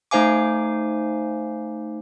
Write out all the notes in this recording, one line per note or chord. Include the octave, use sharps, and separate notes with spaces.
A3 D#4 C5 F5 G#5 D6